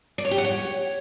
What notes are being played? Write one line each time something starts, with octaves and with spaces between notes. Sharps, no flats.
D5
C#5
G4
F#5
C#5